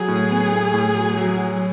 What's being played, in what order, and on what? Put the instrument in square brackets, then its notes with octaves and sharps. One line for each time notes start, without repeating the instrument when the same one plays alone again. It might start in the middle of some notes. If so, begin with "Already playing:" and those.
Already playing: [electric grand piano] F#3 [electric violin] G#4
[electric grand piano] A2
B3
A2
A2
F#3
F#3
F#3